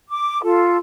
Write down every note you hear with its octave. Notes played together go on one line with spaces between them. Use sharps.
D6
F4 A4